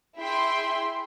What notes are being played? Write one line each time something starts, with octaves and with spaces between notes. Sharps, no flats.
E4 G#4 E5 G5 C6